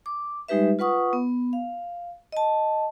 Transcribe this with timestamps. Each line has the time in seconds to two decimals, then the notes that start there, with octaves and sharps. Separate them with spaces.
0.06 D6
0.48 G3 G#3 D#4 G4 B4 E5
0.79 F4 B4 F#5 C#6 D#6
1.13 B3
1.53 F5
2.32 D#5 A5